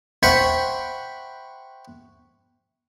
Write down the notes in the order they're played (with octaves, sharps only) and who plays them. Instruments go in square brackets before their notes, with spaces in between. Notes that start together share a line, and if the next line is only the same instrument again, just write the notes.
[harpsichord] C5 E5 F#5 G5 B5 C#6